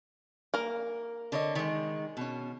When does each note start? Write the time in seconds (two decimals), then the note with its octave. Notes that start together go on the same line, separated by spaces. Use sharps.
0.54 A#3 A#4
1.32 D3 C#5 D#5
1.55 D#3 G#3
2.17 B2 C#4